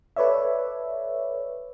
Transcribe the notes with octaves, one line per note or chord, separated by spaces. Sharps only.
A4 B4 C#5 D5 E5